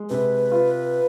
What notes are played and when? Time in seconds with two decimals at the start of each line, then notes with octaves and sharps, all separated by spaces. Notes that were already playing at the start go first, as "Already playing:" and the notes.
Already playing: G#3
0.10 C3 B4
0.52 F4